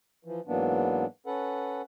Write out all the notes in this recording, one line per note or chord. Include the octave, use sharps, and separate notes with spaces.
E3 F3
G#2 E3 F#3 A#3 B3 D4
C#4 A4 B4 F#5